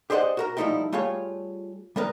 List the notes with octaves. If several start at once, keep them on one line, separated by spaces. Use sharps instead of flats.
G4 G#4 C5 D5 D#5 F#5
F#4 A#4 A#5
F3 G3 A3 D#4 E4 G4
G3 A3 F4 G#4 C#5
G3 B3 A#4 B4